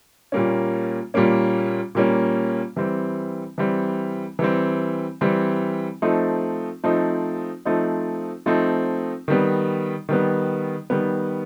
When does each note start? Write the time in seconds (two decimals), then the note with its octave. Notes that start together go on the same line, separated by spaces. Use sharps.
0.32 A#2 G3 A#3 C#4
1.14 A#2 G3 A#3 C#4
1.95 A#2 G3 A#3 C#4
2.76 E3 G3 C4
3.58 E3 G3 C4
4.39 E3 G3 C4
5.21 E3 G3 C4
6.02 F3 A3 C4 D#4
6.84 F3 A3 C4 D#4
7.65 F3 A3 C4 D#4
8.46 F3 A3 C4 D#4
9.28 D#3 G3 B3
10.09 D#3 G3 B3
10.90 D#3 G3 B3